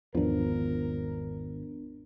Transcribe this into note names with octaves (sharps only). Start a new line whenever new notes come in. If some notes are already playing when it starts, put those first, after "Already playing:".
G#1 E2 F3 B3 D4 A#4